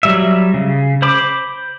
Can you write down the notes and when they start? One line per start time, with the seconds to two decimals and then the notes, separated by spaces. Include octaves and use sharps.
0.03 F#3 G3 E5
0.54 C#3
1.02 C5 B5 D6